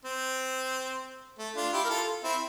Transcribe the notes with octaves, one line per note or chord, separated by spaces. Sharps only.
C4
A3
D4 F4
E4 G4
A#4
F4 A4
C4 E4